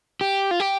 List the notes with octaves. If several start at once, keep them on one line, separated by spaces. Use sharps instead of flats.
G4
F4
G4